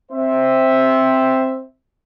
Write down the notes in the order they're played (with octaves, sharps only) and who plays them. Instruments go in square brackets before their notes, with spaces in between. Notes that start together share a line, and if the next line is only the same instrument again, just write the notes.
[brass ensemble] C4 C5 E5